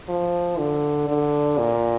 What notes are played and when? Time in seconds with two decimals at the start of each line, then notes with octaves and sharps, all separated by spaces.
0.09 F3
0.58 D3
1.08 D3
1.58 A#2